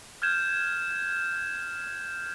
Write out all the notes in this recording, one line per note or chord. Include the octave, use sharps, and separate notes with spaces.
F6 G6 G#6 E7